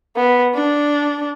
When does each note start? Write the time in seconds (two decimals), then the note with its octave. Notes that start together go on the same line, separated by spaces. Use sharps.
0.16 B3
0.54 D4